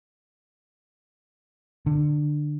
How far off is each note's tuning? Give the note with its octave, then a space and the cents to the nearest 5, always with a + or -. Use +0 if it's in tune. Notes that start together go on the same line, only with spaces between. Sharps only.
D3 +20